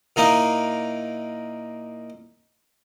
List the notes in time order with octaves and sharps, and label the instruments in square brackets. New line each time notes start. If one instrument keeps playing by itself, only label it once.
[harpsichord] A#2 A#3 D#4 E4